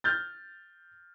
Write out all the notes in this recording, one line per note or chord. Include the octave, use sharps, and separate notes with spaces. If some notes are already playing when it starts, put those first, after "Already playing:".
F6 G6 A6